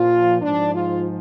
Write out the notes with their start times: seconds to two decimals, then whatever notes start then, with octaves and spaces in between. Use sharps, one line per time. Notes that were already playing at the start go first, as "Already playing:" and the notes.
Already playing: A#2 F3 F4
0.41 G#2 F3 D4
0.74 F4